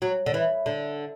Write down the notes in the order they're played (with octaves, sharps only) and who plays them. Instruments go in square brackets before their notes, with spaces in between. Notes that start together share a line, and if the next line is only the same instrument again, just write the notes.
[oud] F#3
D3
E3
D3